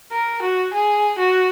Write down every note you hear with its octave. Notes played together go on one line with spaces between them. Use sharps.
A#4
F#4
G#4
F#4